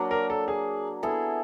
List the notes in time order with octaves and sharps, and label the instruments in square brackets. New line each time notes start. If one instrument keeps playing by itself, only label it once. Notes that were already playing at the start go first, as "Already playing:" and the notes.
Already playing: [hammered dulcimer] F#3 A#3 D4
[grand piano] A#4
A4
G#4
[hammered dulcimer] B3 E4 G#4 [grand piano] A4